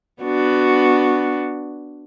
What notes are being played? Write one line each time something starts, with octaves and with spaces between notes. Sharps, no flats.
B3 D4 F#4